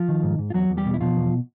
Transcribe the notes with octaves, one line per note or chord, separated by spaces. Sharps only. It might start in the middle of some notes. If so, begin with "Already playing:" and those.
Already playing: F3 F4
D#3
G#2
G#2
F4
E2 F#3 F#4
E2
G3 G4
B2
E4
B2 F3 F4
E2